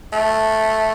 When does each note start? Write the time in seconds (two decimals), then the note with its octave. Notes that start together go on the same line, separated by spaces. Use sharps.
0.13 A3